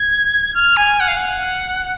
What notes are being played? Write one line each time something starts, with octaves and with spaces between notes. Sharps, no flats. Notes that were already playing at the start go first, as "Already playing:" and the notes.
Already playing: G#6
F6
G#5
F#5
F5
F#5